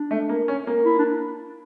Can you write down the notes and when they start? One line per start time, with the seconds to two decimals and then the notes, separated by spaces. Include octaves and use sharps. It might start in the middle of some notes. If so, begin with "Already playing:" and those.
Already playing: D4
0.11 A3
0.29 A#3
0.48 C#4
0.67 A#3
0.85 E4
0.98 D4